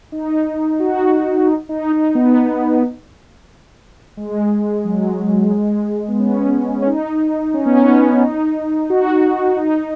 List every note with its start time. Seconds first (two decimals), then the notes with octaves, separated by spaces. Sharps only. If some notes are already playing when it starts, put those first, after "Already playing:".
0.12 D#4
0.80 F#4
1.47 D#4
1.69 D#4
1.92 D#4
2.15 B3
4.17 G#3
4.84 F#3
5.52 G#3
6.08 B3
6.20 C#4
6.82 C#4
6.87 D#4
7.54 C#4
7.66 B3
7.77 C#4
7.88 B3
8.22 D#4
8.90 F#4
9.57 D#4